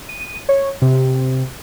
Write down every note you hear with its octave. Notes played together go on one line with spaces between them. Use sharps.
D#7
C#5
C3